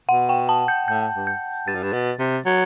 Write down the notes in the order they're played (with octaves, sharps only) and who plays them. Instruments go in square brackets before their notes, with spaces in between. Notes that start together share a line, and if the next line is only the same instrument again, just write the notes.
[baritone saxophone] B2 [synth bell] F#5
[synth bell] G5
A5
G6
[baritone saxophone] A2 [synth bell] G6
[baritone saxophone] G2
[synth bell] G6
[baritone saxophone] G2 [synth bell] A6
[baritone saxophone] F#2
G2
B2
C3
F#3